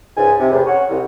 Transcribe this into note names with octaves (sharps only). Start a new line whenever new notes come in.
C#2 G#2 G#5
C3
E2 A2 C3
C#4 F#4 C#5
C2